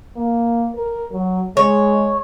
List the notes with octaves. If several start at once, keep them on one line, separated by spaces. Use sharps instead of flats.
A#3
A#4
F#3
G#3 C#5